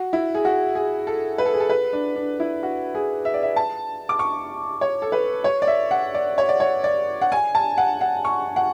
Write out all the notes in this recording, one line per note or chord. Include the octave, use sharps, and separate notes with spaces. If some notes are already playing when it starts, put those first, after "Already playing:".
Already playing: F#4
E4
G#4
F#4
G#4
A4
B4
A4
G#4
A4
B4
D4
D4
E4
F#4
G#4
E5
D5
E5
A5
D6
C#6
C#5
A4
B4
C#5
D5
E5
F#5
D5
C#5
D5
C#5
D5
F#5
G#5
A5
F#5
F#5
C#6
F#5